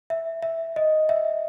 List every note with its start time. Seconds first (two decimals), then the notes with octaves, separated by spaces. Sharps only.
0.10 E5
0.42 E5
0.76 D#5
1.09 E5